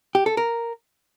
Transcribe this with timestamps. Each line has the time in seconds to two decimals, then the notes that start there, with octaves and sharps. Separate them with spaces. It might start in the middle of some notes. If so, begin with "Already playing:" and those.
0.15 G4
0.26 A4
0.37 A#4